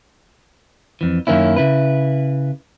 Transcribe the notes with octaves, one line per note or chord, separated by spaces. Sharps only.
F2 E3
F#2 D#3 A#3 C#4 E4
C#3 E4 B4